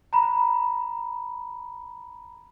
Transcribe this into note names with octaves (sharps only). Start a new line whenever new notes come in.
A#5 B5